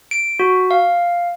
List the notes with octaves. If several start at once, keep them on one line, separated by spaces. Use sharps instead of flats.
D7
F#4
F5